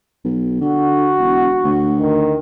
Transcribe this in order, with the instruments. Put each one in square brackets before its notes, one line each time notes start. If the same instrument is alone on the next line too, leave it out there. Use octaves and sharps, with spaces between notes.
[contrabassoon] B1
[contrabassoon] D3 [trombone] F#4
[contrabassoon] E1
D2
[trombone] D#3